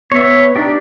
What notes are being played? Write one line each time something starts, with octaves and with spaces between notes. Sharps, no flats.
B3 C#5 E5
D4 D#4 G4